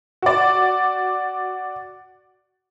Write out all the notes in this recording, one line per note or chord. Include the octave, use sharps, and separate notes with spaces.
F#4 D5